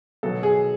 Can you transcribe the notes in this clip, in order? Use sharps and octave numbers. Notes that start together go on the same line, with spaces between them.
B2 F#3 B3 A4
G#4